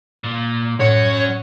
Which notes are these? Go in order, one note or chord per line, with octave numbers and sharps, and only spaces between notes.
A#2
A2 C#4 F#4 C#5